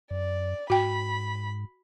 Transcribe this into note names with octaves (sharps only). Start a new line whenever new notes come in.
F#2 D5
G#2 F#4 G5 B5